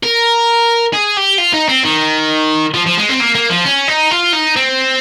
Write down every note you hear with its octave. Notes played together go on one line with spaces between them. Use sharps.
A#4
G#4
G4
F4
D#4
C4
D#3
F3
F3
G#3
C4
A#3
A#3
F3
C#4
D#4
F4
D#4
C4